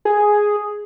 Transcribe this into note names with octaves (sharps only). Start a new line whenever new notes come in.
G#4